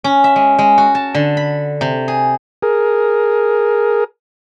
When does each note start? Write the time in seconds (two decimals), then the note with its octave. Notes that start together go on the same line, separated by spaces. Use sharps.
0.04 C#4
0.24 E5
0.36 G#3
0.59 G#3
0.78 F#4
0.95 A5
1.14 D3
1.37 B5
1.81 C3
2.08 G#4
2.63 G#4 A#4